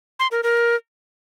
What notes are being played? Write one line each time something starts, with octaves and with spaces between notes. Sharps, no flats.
C6
A#4
A#4